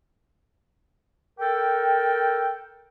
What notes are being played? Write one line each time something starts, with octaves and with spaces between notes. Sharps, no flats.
A4 A#4 G5